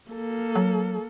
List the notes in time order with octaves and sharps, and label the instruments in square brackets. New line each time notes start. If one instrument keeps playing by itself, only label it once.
[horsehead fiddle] A#3 A4
[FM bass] F#3